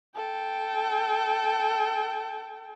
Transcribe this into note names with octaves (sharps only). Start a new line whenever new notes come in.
A4 G5